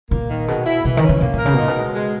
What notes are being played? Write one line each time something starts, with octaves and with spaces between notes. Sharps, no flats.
A#2 A#3
D#3
B2 G#3
E4
B2 E3
D#3
C#4
D#3
B2 A#3
A#2
A#4
C#3
B2
A#2 D#4
B2
G#3
G#3